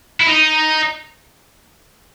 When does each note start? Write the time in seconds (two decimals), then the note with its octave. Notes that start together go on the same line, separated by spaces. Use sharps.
0.20 E4
0.27 D#4